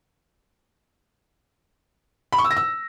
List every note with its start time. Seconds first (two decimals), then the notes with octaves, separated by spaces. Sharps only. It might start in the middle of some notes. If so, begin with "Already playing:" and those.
2.32 B5
2.39 C#6
2.45 E6
2.51 A#6
2.57 E6